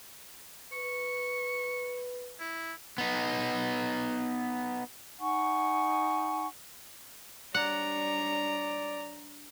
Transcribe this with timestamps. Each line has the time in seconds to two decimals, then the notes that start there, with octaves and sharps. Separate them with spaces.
0.72 B4 C#6
2.40 E4
2.98 B3 D#4
5.20 D#4 F#5 G#5 C#6
7.54 G3 D4 C#5 D5 F#5 A#5